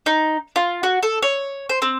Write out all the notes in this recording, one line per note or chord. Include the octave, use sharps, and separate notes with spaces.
D#4
F4
F#4
A4
C#5
C5
C4